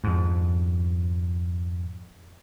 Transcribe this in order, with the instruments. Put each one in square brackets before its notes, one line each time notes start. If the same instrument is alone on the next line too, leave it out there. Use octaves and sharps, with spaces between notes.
[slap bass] F2 G#2